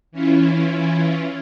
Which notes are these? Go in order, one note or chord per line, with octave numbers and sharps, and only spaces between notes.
E3 C#4 E4 F4